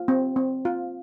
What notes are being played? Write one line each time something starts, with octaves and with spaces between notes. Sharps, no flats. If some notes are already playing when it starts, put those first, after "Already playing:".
Already playing: F4
C4
C4
F4